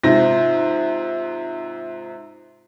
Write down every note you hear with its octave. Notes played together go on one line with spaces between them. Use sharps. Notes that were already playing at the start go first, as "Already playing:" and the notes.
G#2 C3 F4 E5 A#6